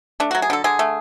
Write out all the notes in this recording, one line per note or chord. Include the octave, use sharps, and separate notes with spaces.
A3 D4
F#3 F#4
G#4
D3 A4
D3 G#4
A3